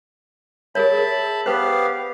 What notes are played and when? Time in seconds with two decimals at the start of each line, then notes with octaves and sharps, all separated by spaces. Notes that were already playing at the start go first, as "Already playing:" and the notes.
0.75 G#4 A#4 C#5 E5 A5 B5
1.46 B3 G4 B4 C5 F5